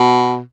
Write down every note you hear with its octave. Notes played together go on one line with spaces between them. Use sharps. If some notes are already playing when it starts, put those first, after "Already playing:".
Already playing: B2